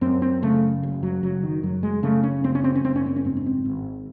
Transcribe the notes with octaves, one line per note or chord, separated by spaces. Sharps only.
F#2 C4
C4
C#3 A3
F#1
F#3
F#1 F#3
D#3
F#2 F#3
G#3
C#3 A3
C#4
F#1 C4
C#4
C4
C#4
F#1 C4
C#4
C4
C#4
G#2 C4
C#4
C4
G#1